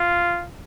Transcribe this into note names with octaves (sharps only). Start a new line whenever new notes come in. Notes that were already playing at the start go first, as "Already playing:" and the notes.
Already playing: F4